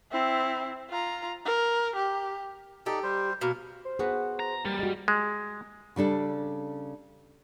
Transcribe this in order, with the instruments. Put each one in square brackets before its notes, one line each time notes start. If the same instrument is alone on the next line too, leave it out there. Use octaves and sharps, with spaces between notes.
[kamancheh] C4 E4
F4 A#5
A#4
G4
[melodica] D#4 A4 D5 [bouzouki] G4
[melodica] G3 C5
[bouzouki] B2 [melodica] A#3 A#4
[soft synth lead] C5
[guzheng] B3 F#4 [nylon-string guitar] G#4
[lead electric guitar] A#5
[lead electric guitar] G3 [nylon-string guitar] A#3 [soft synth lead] A6
[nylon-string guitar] G#3 F#4
[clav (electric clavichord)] G#3
[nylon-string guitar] C#3 G3 D4 A4